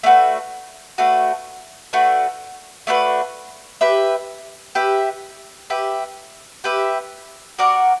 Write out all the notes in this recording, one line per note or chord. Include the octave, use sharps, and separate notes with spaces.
A3 D4 F#4 B4
A3 D4 F#4 B4
A3 D4 F#4 B4
A3 D4 F#4 B4
G4 B4 E5
G4 B4 E5
G4 B4 E5
G4 B4 E5
F#4 A#4 D5 F#5